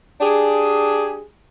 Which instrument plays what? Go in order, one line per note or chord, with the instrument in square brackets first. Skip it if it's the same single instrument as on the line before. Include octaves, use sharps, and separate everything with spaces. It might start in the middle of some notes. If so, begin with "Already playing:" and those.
[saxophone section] D4 G4 G#4